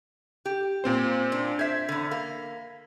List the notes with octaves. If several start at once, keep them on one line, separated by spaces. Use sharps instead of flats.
G4
A#2 C4 C5
D4
C5 E5 G#6 B6
E2 D3
A#3